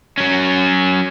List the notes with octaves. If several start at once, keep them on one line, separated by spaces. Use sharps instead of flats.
F#3 C#4